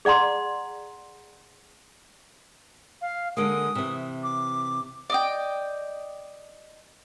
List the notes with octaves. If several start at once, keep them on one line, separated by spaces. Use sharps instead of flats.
G#4 D5 F#5 A#5 C6
F5
D3 G#3 A#3 D#6
C3 E3
D6
D5 D#5 G5